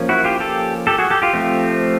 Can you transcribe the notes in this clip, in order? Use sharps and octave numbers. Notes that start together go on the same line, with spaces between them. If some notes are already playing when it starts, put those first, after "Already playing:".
Already playing: F3 A#3 C#4
E4 F#4
F4 G4
G4 A4
G4 A4
F#4 G#4
G4 A4
F4 G4
F3 A3 C4